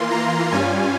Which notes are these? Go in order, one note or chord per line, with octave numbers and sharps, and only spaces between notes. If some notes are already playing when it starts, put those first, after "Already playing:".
Already playing: E3 A#3 F4 C6
A#5
G2 G3 C#4 F4 G#5